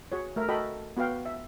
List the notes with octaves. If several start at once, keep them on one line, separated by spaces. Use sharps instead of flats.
F#4 G#4 C#5
A3 A#4 E5
F#4 A4 D#5 G5 B5
B3 F#4 B4 F5 G5
E5